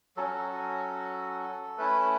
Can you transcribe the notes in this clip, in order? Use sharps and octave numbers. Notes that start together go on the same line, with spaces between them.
F#3 C#4 F#4 A4
A3 C#4 E4 B4